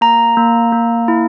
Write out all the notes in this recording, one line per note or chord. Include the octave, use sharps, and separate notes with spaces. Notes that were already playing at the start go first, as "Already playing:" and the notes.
A#3 A#5
A#3
A#3
E4